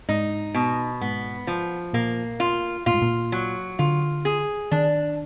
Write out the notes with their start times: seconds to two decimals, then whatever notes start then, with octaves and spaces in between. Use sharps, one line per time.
0.08 G#2 D#4
0.54 B2
1.01 G#2 B3
1.47 F3
1.93 A#2 A#3
2.40 F4
2.86 A#2 F4
2.94 G#2
3.02 A#2
3.32 F#3
3.79 D3 F4
4.25 G#4
4.71 D#3 D4